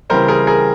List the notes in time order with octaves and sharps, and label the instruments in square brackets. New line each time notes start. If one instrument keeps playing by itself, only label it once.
[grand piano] C#3 E3 G3 C4 A#4 C5
G#4 A#4
G#4 A#4